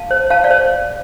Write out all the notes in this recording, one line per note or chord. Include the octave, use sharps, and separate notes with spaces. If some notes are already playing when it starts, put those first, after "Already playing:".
Already playing: F5 A5
C5
C5 F5 A5
D5 F5
C5